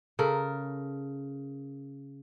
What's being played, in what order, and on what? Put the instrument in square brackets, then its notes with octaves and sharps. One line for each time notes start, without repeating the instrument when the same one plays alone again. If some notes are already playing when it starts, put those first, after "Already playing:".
[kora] C#3 A4 A#4